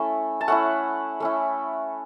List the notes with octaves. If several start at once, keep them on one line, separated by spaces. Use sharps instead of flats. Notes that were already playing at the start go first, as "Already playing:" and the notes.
Already playing: A3 C#4 E4 A5
A5
A3 C#4 E4 F#5
A3 C#4 E4